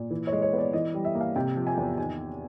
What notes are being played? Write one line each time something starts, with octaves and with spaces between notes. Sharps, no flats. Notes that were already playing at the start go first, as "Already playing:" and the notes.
Already playing: A#2
E3
C#5
G#3
C#5
B3
D5
E3 D#5
G3
E5
A#3
F5
C3 G5
F3
G#5
E2
D#3 G#5